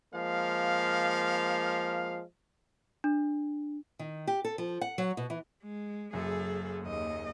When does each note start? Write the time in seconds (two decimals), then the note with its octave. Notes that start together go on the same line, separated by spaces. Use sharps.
0.14 F3 G#3 A#3 F5
3.04 D4
3.99 D#3
4.27 G4
4.44 A4
4.58 F3
4.81 F#5
4.98 F#3
5.17 B2
5.30 E3
5.63 G#3
6.13 F#1 F#2 G#4 A4
6.83 D#2 D#5